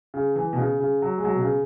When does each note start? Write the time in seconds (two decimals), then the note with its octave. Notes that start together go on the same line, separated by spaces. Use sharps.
0.14 C#3
0.36 E3
0.53 B2
0.58 C#3
0.80 C#3
1.02 F#3
1.18 G#3
1.25 F#3
1.35 B2
1.42 C#3